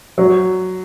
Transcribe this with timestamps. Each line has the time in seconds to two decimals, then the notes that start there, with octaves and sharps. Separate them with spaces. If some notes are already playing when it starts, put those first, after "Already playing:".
0.18 F#3